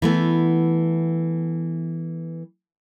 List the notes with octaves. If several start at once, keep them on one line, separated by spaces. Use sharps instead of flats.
E3 A3 B3